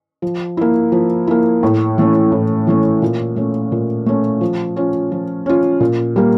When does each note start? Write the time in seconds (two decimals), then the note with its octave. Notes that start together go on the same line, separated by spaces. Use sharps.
0.22 F3
0.57 A#3 E4
0.92 F3
1.27 A#3 E4
1.63 A2
1.98 E3 A3 C#4
2.32 A2
2.67 E3 A3 C#4
3.02 A#2
3.36 A3 C#4
3.72 A#2
4.06 A3 C#4
4.41 F3
4.76 C#4 F4
5.12 F3
5.46 C#4 F4
5.80 A#2
6.16 G3 A#3